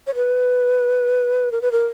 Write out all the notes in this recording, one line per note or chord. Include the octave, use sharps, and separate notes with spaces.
C#5
B4
A#4
B4
A#4